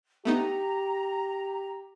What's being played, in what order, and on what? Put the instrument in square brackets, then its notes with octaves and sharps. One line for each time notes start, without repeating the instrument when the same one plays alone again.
[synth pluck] A3 B3 D#4 [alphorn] G4 [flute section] A#5